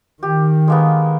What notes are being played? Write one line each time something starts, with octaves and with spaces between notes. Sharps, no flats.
D#3 G4
G#3 A#3 B3